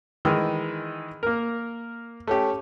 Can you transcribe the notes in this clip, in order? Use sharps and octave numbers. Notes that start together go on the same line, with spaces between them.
D#3 E3 G#3 E6
A#3 A#4
A3 C#4 G4